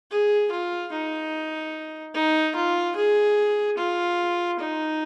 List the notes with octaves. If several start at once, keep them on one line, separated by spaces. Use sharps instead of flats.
G#4
F4
D#4
D#4
F4
G#4
F4
D#4